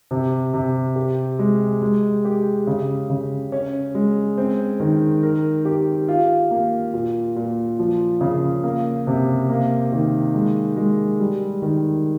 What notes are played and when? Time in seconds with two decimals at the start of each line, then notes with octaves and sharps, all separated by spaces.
0.11 C3
0.54 C3
0.96 G4
1.39 G#3
1.82 G#3
2.25 G4
2.67 C#3
3.10 C#3
3.52 C#4
3.95 G#3
4.38 C4
4.80 D#3
5.23 A#4
5.65 G4
6.08 F4
6.51 A#3
6.94 A#2
7.36 A#2
7.79 F3
8.21 C#3
8.64 A#3
9.07 C3
9.49 A#3
9.92 D#3
10.34 G#3
10.77 G#3
11.20 G3
11.62 D#3